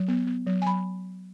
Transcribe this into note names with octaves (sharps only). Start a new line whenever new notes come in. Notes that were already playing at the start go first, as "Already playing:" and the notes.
Already playing: F#3
B3
B3
F#3
G#5
F#3 B5